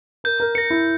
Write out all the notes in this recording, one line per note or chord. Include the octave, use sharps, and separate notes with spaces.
A#4 G6
A#4
A#4 A#6 C#7
E4